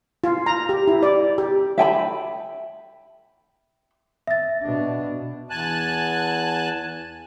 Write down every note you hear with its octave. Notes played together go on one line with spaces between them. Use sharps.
F4
A#5
G4
E4
D5
G4
E5 G5 G#5 B5
E5 A6
B2 D4
E2 G#5 A5 F#6